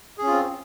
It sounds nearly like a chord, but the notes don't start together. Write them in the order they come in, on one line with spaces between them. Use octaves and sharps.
G#4 C#4 F4 C4